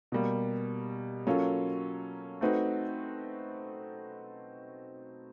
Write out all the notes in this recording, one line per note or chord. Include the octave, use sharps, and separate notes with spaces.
B2 G3 A#3
F#3 A#3 C#4 F4 A4
A3 C4 D#4 F#4 B4